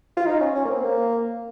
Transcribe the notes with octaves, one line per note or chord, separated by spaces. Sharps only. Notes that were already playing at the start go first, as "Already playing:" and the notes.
F4
D#4
C#4
C#4
A#3
C4
A#3